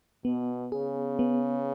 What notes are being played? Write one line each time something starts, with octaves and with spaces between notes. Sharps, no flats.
B2 B3
C#3 G#4
B3